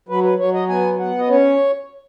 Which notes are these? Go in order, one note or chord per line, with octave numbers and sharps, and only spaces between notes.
F#3 B4
B4
F#3 C#5
D#5
B3 G#5
B3 F#5
D#5
C#4 C#5